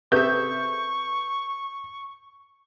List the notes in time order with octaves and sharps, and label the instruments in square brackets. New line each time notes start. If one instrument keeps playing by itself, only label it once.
[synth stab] C3 E5 [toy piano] G#4 A4 B4 [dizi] C#6 [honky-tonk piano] G6